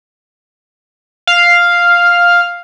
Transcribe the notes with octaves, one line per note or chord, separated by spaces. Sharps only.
F5